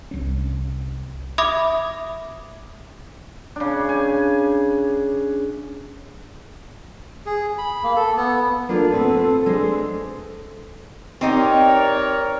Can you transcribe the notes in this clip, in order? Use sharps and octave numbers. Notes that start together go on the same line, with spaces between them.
C2 C#4
E5 B5 D6 D#6 G#6
C#3 D4
G#5
G#4
B5
A#3
A4
B3
A#3 D4 F4 A4
B3 C4 B4
C4
G#3 D4 C5
C4 D#4 G4 A#4 C#5 D5